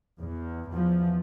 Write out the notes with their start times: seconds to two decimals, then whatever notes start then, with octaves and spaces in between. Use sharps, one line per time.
0.20 E2
0.73 E2 F3